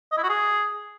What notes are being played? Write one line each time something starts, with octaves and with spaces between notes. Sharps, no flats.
D#5
E4
F#4
G#4